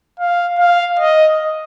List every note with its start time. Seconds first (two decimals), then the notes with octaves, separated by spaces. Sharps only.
0.20 F5
0.59 F5
0.99 D#5